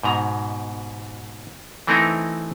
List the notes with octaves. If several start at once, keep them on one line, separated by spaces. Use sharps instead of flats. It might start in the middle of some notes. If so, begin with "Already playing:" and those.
G#2 B2 A#5
E3 A3 C4 D#4 E4 A#4